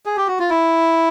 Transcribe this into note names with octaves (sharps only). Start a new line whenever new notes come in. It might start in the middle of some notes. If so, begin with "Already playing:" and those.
G#4
G4
F#4
F4
E4